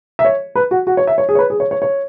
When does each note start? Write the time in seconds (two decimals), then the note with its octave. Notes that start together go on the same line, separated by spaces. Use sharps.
0.19 E5
0.25 C#5
0.56 B4
0.71 F#4
0.87 F#4
0.97 C#5
1.07 E5
1.18 C#5
1.29 G#4
1.35 C#5
1.39 B4
1.50 G#4
1.60 C#5
1.71 C#5
1.82 C#5